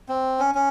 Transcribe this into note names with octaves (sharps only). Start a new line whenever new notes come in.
C4
C#4
C#4